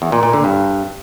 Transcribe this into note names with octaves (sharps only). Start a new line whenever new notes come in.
E2
A#2
A#2
D3
G2